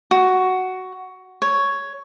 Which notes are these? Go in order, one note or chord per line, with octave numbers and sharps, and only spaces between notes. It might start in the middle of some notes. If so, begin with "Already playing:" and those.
F#4
C#5